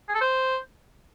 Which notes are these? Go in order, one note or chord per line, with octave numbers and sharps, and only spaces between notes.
G#4
A4
C5